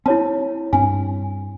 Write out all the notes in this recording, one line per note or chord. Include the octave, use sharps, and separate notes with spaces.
C4 E4 C#5 A5
G2 C4 G#5